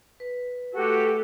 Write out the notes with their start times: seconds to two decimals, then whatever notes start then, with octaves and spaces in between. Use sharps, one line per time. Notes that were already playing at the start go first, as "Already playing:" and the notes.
0.20 B4
0.74 A3 F#4 G4 A4